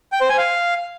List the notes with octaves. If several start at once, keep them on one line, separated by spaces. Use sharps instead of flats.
G5
C5
G#5
F5